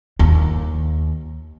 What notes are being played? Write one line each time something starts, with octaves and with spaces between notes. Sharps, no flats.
D#2